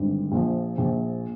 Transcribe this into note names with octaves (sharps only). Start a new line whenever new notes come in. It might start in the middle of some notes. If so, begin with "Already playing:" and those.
Already playing: G#1 G2 D3
A#1 A#2 F3
A#1 A#2 F3